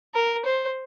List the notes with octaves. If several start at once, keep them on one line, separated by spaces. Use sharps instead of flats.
A#4
C5